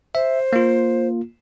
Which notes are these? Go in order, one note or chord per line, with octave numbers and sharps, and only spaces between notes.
C5 E5
A#3 F4